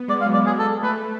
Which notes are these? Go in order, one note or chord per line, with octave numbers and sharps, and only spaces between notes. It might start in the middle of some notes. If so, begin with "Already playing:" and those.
Already playing: B3
G#3 D5
F5
F#3
D5
G#3
G#4
G#3 A4
A3 B4